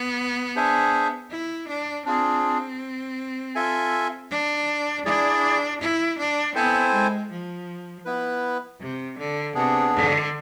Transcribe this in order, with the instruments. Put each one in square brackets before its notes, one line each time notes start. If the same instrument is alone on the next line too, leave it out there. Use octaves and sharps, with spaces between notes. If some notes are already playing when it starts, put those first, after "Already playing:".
Already playing: [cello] B3
[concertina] D4 G#4 C5 E5 G#5
[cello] E4
D4
[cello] C4 [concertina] D4 F4 G#4
[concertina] F4 A4 E5 G#5
[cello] D4
[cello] D4 [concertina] E4 G#4 D5
[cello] E4
D4
[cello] B3 [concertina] C4 E4 A4 C5 G#5
[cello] G#3
F3
[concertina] B3 E4 B4
[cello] C3
D3
[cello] C3 [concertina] B3 D4 G#4
[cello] D3